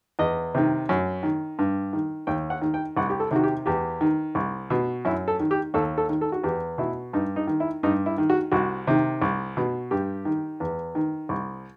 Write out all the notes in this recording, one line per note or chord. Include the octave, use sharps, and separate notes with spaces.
E2 D#5
C3 D#3
F#2
D#3
G2
D#3
D#2 G5
F#5
D#3
G5
C2 F#5
G4
A4
C3 D#3 F#4
G4
E2 G4
D#3
C2
B2
F#2 E4
A4
D#3
G4
D#2 A4
A4
D#3
A4
F#4
E2 G4
B2 E4
G2 D#4
D#4
D#3
E4
G2 D#4
E4
D#3
F#4
C2 F#4
C3 D#3
C2
B2
G2 G4
D#3
E2
D#3
C2